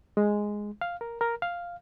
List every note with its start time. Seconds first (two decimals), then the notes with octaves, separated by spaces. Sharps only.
0.17 G#3
0.81 F5
1.01 A#4
1.21 A#4
1.42 F5